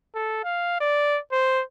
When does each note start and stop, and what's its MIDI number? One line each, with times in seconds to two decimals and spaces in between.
0.15 0.41 69
0.44 0.79 77
0.80 1.18 74
1.32 1.62 72